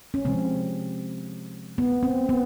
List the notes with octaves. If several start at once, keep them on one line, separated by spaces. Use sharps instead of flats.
C#4
C3 F3 G#3 C4
B3
C4
B3